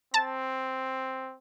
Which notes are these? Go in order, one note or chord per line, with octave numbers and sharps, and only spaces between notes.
C4 A5 A6